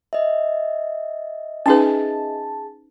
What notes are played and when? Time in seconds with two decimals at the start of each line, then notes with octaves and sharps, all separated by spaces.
0.13 D#5 E5
1.66 C#4 D#4 G#4 B4 A5